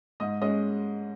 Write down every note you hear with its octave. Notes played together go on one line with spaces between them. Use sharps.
G#2 D#5 D#6
G#3 C#4 D#5 D#6